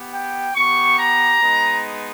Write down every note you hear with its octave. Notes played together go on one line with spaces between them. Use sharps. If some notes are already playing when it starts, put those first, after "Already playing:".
Already playing: B3 G4
G5
B3 G4 C#6
A#5
G#3 B3 D#4